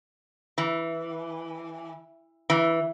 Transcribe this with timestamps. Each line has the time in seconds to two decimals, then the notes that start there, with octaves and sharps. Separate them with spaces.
0.58 E3
2.50 E3